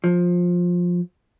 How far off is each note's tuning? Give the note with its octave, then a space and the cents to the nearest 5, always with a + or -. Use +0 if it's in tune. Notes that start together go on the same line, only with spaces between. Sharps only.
F3 +15